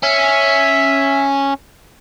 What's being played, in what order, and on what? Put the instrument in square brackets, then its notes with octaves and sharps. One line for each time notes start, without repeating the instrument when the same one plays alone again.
[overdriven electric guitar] C#4 [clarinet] E5